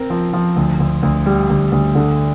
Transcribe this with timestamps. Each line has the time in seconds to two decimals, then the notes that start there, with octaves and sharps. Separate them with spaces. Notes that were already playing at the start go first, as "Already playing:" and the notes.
Already playing: C4 A#4
0.10 F3
0.33 F3
0.56 D2
0.80 D2
1.03 D2
1.26 G3
1.50 D2
1.72 D2
1.95 D3